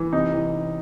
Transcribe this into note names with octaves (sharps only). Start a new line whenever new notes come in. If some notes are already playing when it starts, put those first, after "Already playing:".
Already playing: E3
C3 D#4
E3